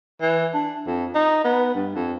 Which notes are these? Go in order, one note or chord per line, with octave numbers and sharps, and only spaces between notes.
E3
D4
F2
D#4
B3
G2
F2